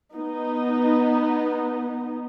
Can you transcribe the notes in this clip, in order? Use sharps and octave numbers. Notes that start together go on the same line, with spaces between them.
B3 D#4